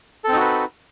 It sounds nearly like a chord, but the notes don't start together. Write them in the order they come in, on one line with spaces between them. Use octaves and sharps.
A4 C4 D#4 F#4 B4